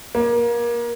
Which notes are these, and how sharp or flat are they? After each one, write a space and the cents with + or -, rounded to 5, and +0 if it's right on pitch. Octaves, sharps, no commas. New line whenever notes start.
A#3 +30